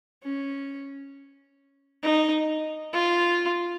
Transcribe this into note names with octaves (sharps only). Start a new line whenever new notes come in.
C#4
D#4
F4